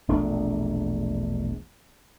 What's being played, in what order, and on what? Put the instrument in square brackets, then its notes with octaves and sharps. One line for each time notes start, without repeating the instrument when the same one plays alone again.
[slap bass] E1 A#1 A3 D4